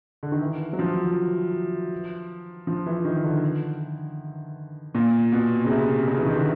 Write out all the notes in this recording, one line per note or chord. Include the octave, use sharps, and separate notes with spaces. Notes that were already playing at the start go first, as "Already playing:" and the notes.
D3
D#3
E3
F#3
F3
F3
E3
D#3
D3
A#2
B2
C#3
C3
C#3
E3
D#3
D3